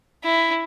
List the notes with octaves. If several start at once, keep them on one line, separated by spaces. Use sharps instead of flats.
E4